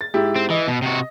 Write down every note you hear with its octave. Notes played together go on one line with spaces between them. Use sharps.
A6
G#2 E4 G4
C4
E3 D#5
B2
C3 F#4